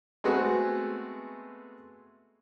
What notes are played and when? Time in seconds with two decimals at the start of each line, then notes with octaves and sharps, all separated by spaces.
0.24 G#3 A3 B3 C4 F#4 G#4